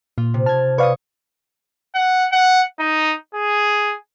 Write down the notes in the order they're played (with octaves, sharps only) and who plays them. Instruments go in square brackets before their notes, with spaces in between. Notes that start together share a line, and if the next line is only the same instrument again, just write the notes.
[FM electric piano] A#2 [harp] F4
[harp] C3
[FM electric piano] A5 [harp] F6 G#6
[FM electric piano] B4 D5 F5 [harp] C#6 D#6
[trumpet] F#5
F#5
D#4
G#4